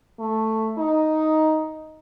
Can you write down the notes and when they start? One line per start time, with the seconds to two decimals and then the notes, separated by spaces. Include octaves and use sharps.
0.19 A3
0.78 D#4